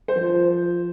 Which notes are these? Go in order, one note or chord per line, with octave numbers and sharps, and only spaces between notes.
C5
F3